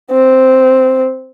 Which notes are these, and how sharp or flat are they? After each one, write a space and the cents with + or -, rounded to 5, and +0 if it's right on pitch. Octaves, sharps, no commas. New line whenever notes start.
C4 -5